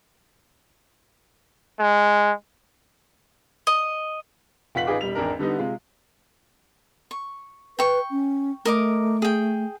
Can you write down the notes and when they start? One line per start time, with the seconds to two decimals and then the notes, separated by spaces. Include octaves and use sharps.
1.80 G#3
3.67 D#5
4.75 F1 F4 F#5 B6 F#7
4.87 A1 D#4 F4 G#4 B4 D6
5.01 E1 G3 F7
5.15 G#1 E2 D4 A#4
5.39 D3 G3 B3 D#4
5.59 C3 G#3 F4
7.11 C#6
7.79 B4 G5 C#6
8.11 C#4
8.65 A3 A#4 D#5 D6
9.22 G#4 G5